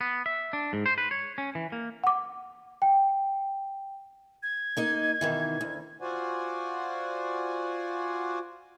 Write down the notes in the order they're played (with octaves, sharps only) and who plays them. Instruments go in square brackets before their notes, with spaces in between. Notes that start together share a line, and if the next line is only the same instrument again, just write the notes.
[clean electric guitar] B3
E5
D4
G#2
C5
B4
C#5
C#4
E3
A#3
[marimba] F#5 D6
[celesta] G5
[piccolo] G#6
[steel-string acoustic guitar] A#3 D#4 D#5
B2 D#3 E3
D2
[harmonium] F4 F#4 C5 D5 F#5 G#5